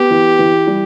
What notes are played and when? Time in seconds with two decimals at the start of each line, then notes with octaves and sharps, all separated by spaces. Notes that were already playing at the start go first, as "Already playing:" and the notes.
Already playing: B3 G4
0.10 E3
0.39 E3
0.67 G3